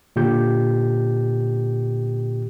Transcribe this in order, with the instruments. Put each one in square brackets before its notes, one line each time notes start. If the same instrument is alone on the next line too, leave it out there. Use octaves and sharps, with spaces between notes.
[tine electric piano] A#2 D3 G4 G6